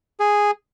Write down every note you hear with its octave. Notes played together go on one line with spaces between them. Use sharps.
G#4